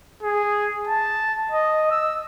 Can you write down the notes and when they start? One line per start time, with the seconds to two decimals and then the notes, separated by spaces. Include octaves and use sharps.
0.23 G#4
0.88 A5
1.51 D#5
1.91 E6